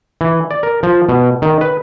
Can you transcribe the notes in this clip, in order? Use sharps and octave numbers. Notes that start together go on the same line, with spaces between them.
E3
D5
A#4
F3
B2
D#3
B4